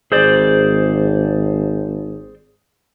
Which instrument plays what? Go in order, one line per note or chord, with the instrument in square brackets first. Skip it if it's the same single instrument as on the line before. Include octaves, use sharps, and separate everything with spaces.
[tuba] G#1 [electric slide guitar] G#4 C5 D5